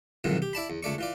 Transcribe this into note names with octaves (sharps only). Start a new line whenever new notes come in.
B1 F2 G#2 D#3 E3
G4
E4 D5 A5 B5
E2
C#2 A3 D5 C#6
E3 F4 D5